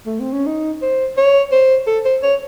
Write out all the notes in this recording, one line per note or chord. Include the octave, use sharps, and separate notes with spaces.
A3
C4
C#4
D#4
C5
C#5
C5
A4
C5
C#5